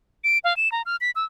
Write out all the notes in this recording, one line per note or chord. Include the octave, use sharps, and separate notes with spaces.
D7
F5
E7
A#5
F6
B6
E6